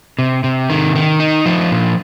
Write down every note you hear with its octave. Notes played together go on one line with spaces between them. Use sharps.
C3
C3
D#3
D#3
D#4
F3
A#2